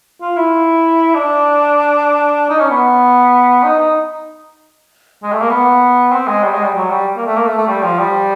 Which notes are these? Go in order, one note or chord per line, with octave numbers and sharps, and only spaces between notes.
F4
E4
D4
D#4
C#4
B3
D#4
D#4
G#3
A3
A#3
B3
C4
G#3
G3
G#3
G3
F#3
G3
A#3
A3
A#3
A3
A3
G3
F3
G3